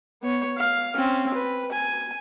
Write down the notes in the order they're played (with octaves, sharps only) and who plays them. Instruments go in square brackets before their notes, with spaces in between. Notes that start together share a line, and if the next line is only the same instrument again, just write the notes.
[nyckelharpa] B3 C#5
F5
C4 C#4
B4
G#5